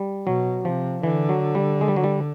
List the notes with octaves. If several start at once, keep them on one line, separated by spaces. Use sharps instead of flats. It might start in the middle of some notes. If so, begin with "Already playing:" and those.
Already playing: G3
B2 F#3
C3 F3
D3 E3
F#3
G3
G#3
G3
F#3
G3